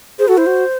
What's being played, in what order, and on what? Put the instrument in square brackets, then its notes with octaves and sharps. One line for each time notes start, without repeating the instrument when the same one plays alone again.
[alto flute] G#4 [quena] C5
[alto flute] F#4 [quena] A4
[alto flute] E4 [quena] C5
[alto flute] F#4